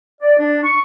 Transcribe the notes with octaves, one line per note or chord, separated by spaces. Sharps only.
D5
D4
C#6